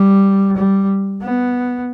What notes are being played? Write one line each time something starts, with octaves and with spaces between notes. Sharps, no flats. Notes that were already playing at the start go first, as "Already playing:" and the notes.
Already playing: G3
G3
B3